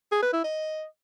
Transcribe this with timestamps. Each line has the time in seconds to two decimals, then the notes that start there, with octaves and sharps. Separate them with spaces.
0.12 G#4
0.23 B4
0.33 E4
0.44 D#5